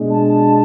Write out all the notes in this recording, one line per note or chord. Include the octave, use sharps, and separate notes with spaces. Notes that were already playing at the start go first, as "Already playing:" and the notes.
Already playing: B2 G#3 D4
A5